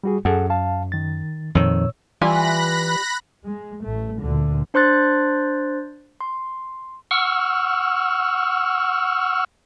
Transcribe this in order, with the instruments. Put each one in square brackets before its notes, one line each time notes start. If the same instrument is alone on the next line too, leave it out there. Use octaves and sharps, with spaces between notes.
[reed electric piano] G3 F#4 G#4
[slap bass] F#2 [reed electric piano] G#4 A4 F#5
[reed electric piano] F5 A5
D#3 A6
[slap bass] F2 D#3 [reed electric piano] A#2 C#5 E6
[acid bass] E3 [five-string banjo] G3 F4 G#5 [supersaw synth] B5 F#6 A#6
[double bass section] G#3
A1 A3
D2 A#2 D3
[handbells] D4 C5 C6 F#6 A6
C6
[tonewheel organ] F#5 C#6 E6 F6